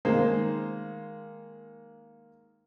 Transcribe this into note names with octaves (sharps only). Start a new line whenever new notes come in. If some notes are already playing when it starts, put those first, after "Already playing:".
D#3 G#3 A#3 C5